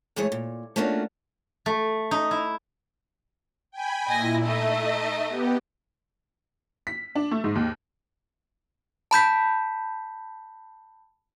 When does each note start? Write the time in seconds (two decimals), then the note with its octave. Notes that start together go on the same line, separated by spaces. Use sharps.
0.16 F#2 E3 G#3 A3 G#4 C#5
0.32 A#2
0.76 A3 A#3 C#4 D4 F4 F#4
1.66 A3
2.11 D#4
2.31 E4
3.71 G5 G#5 B5
4.07 A#2 E4 D#5 G#5 A#6
4.44 A3 D#4 D#5 E5
5.27 B3 G4
6.87 B6
7.15 D4
7.31 A3
7.44 G#2
7.55 D#2
9.11 A5 B5 G6 B6